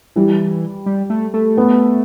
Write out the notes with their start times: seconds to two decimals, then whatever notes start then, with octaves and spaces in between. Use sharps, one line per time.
0.16 E3 G3
0.86 G3
1.10 A3
1.34 A3
1.57 B3